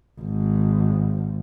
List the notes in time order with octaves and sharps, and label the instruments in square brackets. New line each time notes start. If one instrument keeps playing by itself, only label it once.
[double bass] G#1